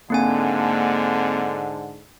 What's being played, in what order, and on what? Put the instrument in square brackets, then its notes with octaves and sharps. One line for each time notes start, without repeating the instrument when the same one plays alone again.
[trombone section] G#2 D3 [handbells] A#3 C4 G#5